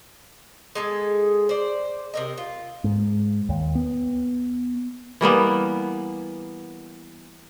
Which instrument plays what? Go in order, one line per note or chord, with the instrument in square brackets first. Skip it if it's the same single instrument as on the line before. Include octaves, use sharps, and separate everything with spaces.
[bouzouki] G#3 G#4 A4
C5 D5
C3 A#4 D#5
F4
[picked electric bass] G#2
D#2
B3
[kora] E3 G3 A#3 B3